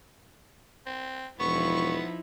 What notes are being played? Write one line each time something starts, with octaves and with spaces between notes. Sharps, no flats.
C4
E1 F3 B3 D#4 E4 C#6